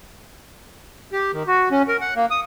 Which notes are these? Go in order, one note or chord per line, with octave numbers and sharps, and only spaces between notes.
G4
D#3
F#4
C#4
A#4
F#5
A#3
D#6